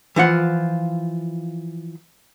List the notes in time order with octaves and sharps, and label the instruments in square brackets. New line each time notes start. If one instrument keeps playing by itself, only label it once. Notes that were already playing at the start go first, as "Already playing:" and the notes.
[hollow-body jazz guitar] E3 F3 F4 F#5